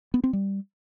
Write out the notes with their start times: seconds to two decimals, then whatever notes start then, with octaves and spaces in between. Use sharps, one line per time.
0.14 B3
0.24 C4
0.33 G3